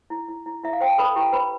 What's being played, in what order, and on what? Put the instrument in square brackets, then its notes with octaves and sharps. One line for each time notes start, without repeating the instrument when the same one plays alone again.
[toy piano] E4
E4
E4
E4 E5
F5
C5 G5
A5
A4 B4 B5
E4 G4 G5
B4 C5 B5